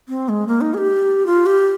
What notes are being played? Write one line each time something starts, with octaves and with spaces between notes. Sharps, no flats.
C4
G#3
A#3
D#4
G#4
G4
F4
G4